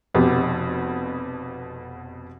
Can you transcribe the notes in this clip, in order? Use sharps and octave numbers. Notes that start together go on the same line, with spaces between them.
F1 F2 B2 B3 G4